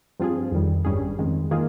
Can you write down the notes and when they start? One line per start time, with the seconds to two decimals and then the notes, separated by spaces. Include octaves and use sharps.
0.20 G2 F3 C4 F4 G#4
0.51 F2 D#3 G3
0.85 G#1 G2 G3 C#4 G#4
1.19 F2 D#3 G#3
1.51 D#3 A#3 F4 G#4